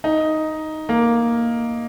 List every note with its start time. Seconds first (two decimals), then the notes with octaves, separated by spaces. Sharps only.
0.04 D#4
0.89 A#3